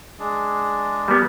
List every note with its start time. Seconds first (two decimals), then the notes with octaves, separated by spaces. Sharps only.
0.19 G#3 D4 G#4
1.08 G3 A#3 B3